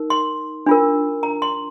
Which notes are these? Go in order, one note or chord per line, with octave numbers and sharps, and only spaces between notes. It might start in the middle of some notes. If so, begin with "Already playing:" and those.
Already playing: D#4 A#4
C6
D4 F4 A#4
A#5
C6